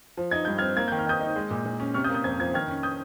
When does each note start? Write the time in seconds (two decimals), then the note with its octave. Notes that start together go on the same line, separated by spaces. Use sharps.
0.17 F3
0.31 D#4 G#6
0.45 G2 G6
0.58 C4 F6 G#6
0.77 A#3 G#6
0.88 D#3 G6
0.99 F6
1.06 D#3 D#6 G6
1.21 D#4
1.36 G#3
1.51 A#2
1.65 A#2
1.80 C#4
1.94 C3 C#6 F6
2.04 D#6 G6
2.09 A#3
2.14 D#6 G6
2.24 F2 G#6
2.39 F3 G#6
2.54 D#3 F6 G#6
2.68 C#4
2.83 D#6 G6